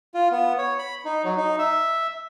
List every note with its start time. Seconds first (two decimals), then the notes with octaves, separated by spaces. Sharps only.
0.14 F4
0.32 B3
0.58 C#5
0.79 B5
1.05 D#4
1.25 F#3
1.38 D#4
1.59 E5